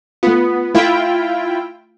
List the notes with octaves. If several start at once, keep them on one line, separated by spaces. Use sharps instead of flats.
A3 B3 F4
A3 E4 F4 G5